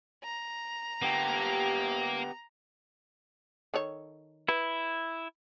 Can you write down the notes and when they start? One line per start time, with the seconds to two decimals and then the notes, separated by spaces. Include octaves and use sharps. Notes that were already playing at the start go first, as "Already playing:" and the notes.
0.24 A#5
1.02 A#3 B3 G4
3.74 D#3 A4 C#5
4.48 E4 B4